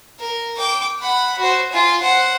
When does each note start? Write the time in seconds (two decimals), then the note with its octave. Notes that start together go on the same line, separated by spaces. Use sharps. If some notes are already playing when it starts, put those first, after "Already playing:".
0.19 A#4
0.57 G5 D6
1.00 F#5 B5
1.38 F#4 C5
1.72 F4 G#5
2.02 C5 F#5